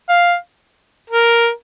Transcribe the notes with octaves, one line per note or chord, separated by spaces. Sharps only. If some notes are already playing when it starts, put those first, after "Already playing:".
F5
A#4